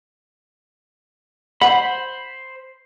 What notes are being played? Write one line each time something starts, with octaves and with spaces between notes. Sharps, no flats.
C5 F#5 B5